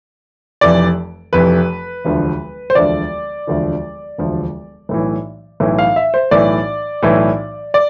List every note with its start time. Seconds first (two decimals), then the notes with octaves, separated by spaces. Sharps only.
0.61 F1 F2 E3 D5
1.33 F1 F2 E3 B4
2.05 E1 D2 D3 F3
2.70 C5
2.75 E1 D2 D3 F3 D5
3.47 E1 D2 D3 F3
4.18 E1 D2 D3 F3
4.89 B1 A2 E3
5.60 B1 A2 E3
5.79 F5
5.96 E5
6.14 C5
6.31 B1 A2 E3 D5
7.03 B1 A2 E3
7.74 D5